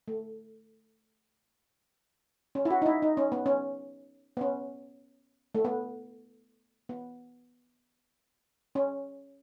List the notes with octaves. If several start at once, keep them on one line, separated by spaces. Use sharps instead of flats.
A3
C#4
E4
F#4
D#4
E4
D#4
C#4
B3
C#4
B3
C#4
A3
B3
B3
C#4